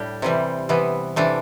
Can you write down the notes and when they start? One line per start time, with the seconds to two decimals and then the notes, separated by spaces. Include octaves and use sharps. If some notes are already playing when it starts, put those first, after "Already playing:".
Already playing: A2 G3 D4 G4
0.22 C3 E3 G3
0.69 C3 E3 B3
1.16 C3 E3 A3 D4